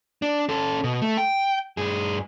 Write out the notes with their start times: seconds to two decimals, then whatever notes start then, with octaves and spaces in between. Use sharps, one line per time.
0.22 D4
0.49 C#4 A4
0.84 B2
1.02 A3
1.17 G5
1.77 G2 G#4